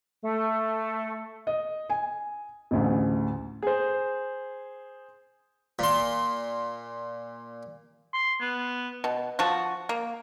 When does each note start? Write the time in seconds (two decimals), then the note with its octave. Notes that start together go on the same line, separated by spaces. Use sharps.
0.24 A3
1.47 D#5
1.90 G#5
2.71 A1 D2 C#3
3.63 G#4 C5
5.79 A#2 C6
8.14 C6
8.41 B3
9.04 B2
9.39 F3 F#4
9.89 A#3